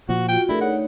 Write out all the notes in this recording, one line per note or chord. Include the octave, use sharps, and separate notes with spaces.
A#2 F3 F#4
F4 F#4 G5
A3 D4 E4 G#4 A#4
D#4 C#5 F#5